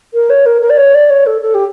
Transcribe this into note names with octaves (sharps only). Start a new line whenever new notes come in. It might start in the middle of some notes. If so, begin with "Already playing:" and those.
A#4
C#5
A#4
A#4
D5
C#5
D5
C#5
A4
A4
G4